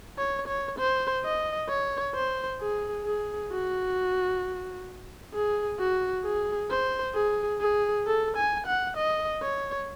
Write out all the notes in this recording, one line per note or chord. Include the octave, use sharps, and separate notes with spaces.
C#5
C#5
C5
D#5
C#5
C5
G#4
G#4
F#4
G#4
F#4
G#4
C5
G#4
G#4
A4
G#5
F#5
D#5
C#5